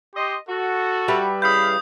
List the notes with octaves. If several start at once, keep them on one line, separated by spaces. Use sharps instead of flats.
G4 D#5 C6
F#4 A4
G3 B4 E5
C#3 E3 F5 B5 D#6 G6